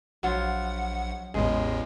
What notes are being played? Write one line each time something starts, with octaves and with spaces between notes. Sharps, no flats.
A#1 F#3 F4 F#5
A1 E2 A2 G#3